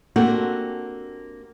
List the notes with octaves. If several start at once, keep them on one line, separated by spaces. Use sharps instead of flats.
A#3 C4 D4 F#4 G4 A4